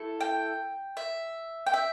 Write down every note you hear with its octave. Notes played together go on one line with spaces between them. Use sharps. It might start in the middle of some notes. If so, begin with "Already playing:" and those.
Already playing: A3 E4 A4
G5
E5
G5
E5